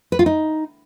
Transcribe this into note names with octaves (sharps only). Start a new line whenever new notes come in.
B4
F4
D#4